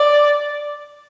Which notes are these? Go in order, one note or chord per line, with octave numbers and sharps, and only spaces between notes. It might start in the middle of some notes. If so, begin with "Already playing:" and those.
Already playing: D5